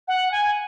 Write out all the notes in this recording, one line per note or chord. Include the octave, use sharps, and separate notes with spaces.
F#5
G#5